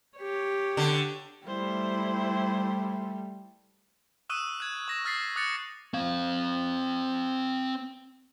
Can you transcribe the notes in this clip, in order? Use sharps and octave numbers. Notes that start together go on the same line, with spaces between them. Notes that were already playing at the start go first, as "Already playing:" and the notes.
G4 C#5
D3
G3 A3 E4 C5
C#6 D#6 E6 F#6 D#7
F#6 G#6
C#6 A#6 E7
D#6 F6 A6 B6 C7
D6 D#6 F#6 A6 C#7
C4 F5